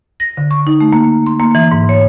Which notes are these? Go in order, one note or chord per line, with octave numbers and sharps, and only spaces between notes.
A#6
D3
C#6
D#4
A3
A#3
C6
A#3
E3
G#2
C#5